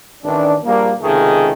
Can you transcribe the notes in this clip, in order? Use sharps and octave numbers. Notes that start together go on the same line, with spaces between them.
A1 D#3 D4
A#1 G3 A#3
C#2 C3 D#3 A3 G#4